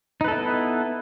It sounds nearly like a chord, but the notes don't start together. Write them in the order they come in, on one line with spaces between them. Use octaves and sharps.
D#4 B4 A4 E4 B3